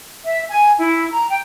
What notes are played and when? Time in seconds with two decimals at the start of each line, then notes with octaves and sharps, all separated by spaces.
0.23 E5
0.48 G#5
0.78 E4
1.11 A#5
1.29 G5